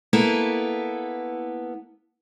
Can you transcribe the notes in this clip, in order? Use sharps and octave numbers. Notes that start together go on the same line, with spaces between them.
A#3 B3 E4 A4